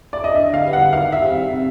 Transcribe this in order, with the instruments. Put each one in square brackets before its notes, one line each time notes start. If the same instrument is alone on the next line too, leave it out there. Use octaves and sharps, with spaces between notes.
[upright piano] D5
D#5
[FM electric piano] D3 [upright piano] E5
[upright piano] F5
[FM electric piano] G3 B3
[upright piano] F#5
[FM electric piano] D#3 [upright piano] F5
[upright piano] E5
[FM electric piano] G3 C4
C3